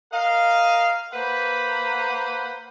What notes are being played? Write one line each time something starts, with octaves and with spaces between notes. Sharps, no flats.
A#4 D#5 F5
A#3 B4 C5 F#5 B5